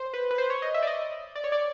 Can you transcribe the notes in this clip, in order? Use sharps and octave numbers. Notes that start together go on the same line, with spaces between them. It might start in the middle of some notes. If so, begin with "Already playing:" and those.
Already playing: C5
B4
B4
C5
C#5
D#5
E5
D5
D#5
D5
C#5
D5